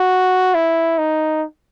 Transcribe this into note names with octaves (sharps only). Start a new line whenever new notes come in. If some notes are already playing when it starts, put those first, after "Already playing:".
Already playing: F#4
E4
D#4